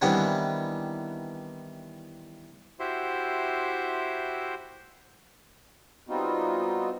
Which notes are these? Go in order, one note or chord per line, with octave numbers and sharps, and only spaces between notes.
D#3 E3 G3 B3 C4 D4
E4 F#4 G4 C5 E5 C6
G3 B3 C4 D#4 F4 F#4